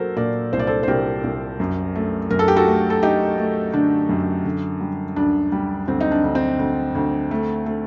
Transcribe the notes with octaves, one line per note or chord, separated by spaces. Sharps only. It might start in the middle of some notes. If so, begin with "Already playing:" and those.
Already playing: F#3 A#3 A4 A#4 C5
A#2 A#4 D5
C2 C5
D5
A4 C5
C5
C2 G4 A#4
C2
F#2
A3
F#2 A#4
A4
G4
F#4 A4
A3
A4
A3 D#4 G4
A3
D3 D4
F#2
D3
G3
D2 D4
G3
D2 C4
D#4
D4
D2
C4
D2
D2
A3
A3